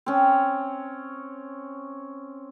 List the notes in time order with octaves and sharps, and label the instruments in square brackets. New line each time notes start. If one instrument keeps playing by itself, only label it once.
[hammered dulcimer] C4 C#4